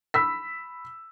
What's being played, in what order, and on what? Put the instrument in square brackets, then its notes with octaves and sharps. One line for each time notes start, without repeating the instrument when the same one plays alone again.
[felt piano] B5 E6 B6